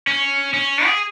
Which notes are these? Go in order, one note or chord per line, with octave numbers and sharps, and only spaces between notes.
C#4
C#4
G#4